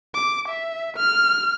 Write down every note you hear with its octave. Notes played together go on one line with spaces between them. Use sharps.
D6
E5
F6